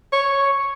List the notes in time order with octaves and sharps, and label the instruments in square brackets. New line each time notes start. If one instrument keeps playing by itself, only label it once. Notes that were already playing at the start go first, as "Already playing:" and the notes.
[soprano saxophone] C#5